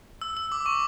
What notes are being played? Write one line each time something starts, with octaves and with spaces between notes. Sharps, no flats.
E6
E6
D6
C#6